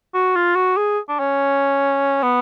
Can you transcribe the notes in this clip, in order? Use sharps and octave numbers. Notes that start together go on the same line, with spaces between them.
F#4
F4
F#4
G#4
D4
C#4
B3